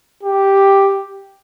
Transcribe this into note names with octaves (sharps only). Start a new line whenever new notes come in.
G4